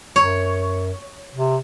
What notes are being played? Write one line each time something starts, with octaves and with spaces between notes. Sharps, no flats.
F#2 C#5
C3